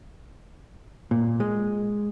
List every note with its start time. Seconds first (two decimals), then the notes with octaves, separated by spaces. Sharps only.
1.11 A#2
1.40 G#3